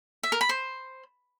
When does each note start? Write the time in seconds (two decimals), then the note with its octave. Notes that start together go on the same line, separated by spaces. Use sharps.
0.23 E5
0.32 A#4
0.41 B5
0.49 C5